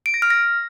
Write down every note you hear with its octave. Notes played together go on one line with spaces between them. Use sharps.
D7
A#6
F6
A#6